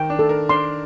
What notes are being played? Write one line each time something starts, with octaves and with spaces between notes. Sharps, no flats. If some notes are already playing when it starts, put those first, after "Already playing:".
Already playing: D#3 G5
D4
A4
A#4
D4 C6